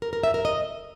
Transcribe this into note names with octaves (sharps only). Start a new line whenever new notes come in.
A#4
A#4
E5
A#4
D#5